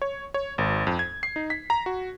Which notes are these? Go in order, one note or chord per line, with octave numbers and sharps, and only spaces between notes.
C#5
C#5
G#1
F2
G#6
C7
D#4
B6
A#5
F#4